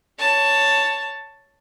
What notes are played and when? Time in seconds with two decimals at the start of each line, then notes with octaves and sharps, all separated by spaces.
0.19 C#5 A5